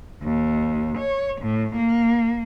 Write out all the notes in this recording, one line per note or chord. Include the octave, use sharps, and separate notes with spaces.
D#2
C#5
A2
A#3